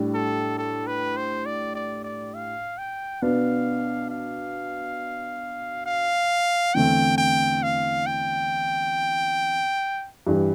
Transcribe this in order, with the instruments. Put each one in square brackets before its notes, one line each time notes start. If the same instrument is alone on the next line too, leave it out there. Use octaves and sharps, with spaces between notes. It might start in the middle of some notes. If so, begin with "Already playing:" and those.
Already playing: [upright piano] A2 G3 D4
[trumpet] A4
A4
B4
C5
D5
D5
D5
F5
G5
[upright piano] B2 B3 D4 [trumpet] F5
[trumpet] F5
F5
[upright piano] E2 D3 A3 C4 [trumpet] G5
[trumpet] G5
F5
G5
[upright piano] G2 E3 G3